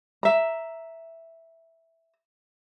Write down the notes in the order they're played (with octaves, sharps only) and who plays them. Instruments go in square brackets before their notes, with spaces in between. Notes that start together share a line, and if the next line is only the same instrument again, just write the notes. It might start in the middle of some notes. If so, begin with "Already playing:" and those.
[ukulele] E5 A#5